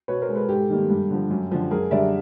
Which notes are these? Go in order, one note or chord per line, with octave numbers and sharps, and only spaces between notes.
B2 B4 C#5
A#4 C5
G#3
A4 B4
G#2 G4 A4
D#3 G3 A#3
G2
D3 F3
F#2
D3 F3
F#2 G#4 A#4
D3 G3 D5 E5